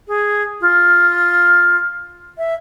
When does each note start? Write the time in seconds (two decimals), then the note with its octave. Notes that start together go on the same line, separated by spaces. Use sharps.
0.08 G#4
0.61 F4
2.38 E5